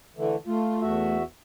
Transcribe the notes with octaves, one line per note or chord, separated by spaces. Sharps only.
D3 E3 A3
A3 F4
E2 F#4 E5